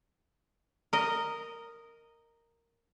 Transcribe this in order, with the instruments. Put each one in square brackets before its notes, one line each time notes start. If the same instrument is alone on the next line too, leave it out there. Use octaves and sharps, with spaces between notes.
[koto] A#4 D#5